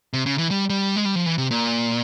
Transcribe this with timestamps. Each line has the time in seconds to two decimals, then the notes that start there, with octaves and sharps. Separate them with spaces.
0.13 C3
0.26 C#3
0.38 E3
0.51 G3
0.70 G3
0.96 G#3
1.05 G3
1.15 F3
1.26 E3
1.38 C3
1.51 A#2